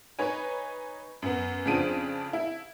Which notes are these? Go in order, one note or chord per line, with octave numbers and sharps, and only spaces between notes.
D#4 B4 C#5 G#5
F#2 B3
F2 C#3 F3 D4 D7 D#7
E4